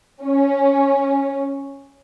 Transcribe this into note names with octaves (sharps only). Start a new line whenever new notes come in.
C#4